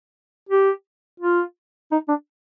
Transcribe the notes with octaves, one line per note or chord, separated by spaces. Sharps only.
G4
F4
D#4
D4